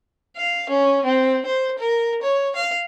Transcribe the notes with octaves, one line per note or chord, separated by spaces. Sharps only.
F5
C#4
C4
C5
A#4
C#5
F5